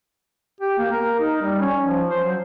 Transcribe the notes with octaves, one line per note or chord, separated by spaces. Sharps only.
G4
A#3
A#4
D#4
G3
C#4
F3
C5
F#3